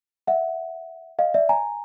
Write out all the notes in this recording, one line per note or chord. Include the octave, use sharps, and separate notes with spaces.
E5 F#5
D#5 F5
D5 E5
G#5 A#5